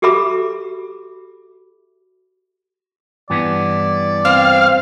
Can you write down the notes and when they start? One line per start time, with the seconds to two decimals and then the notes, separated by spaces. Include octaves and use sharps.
0.02 F#4 G4 A4 E5 B5 D6
3.30 G2 E3 B3 D5
4.25 C4 F5